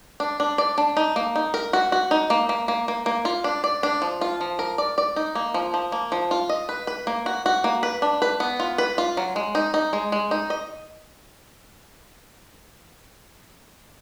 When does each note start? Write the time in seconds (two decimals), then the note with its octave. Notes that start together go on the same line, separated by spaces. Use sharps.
0.20 D4
0.40 D4
0.58 D5
0.78 D4
0.97 D#4
1.16 A#3
1.36 D#4
1.54 A#4
1.73 F#4
1.92 F#4
2.11 D#4
2.30 A#3
2.49 A#3
2.68 A#3
2.88 A#3
3.06 A#3
3.25 F4
3.44 D4
3.64 D5
3.83 D4
4.02 F3
4.21 F4
4.41 F3
4.59 A#4
4.78 D5
4.98 D5
5.16 D#4
5.35 A#3
5.54 F3
5.74 F3
5.92 A#3
6.12 F3
6.31 F4
6.49 D#5
6.69 B4
6.87 B4
7.07 A#3
7.26 F#4
7.46 F#4
7.64 A#3
7.83 B4
8.02 D4
8.22 B4
8.40 B3
8.60 F4
8.78 B4
8.98 F4
9.17 F#3
9.36 G#3
9.55 D#4
9.74 D#4
9.93 G#3
10.12 G#3
10.31 D#4
10.50 D#5